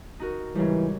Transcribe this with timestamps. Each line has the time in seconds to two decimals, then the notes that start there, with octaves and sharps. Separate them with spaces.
0.20 D#4 F#4 A#4
0.55 G#2 C#3 E3 G3